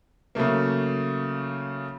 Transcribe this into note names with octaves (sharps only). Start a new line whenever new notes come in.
C#3 F#3 A3 A#3